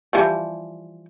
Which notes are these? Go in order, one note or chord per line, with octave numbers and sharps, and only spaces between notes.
E3 F3 G3